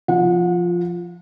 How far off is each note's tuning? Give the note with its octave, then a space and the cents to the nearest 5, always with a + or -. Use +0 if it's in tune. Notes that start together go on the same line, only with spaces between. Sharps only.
F3 +0 F#5 -35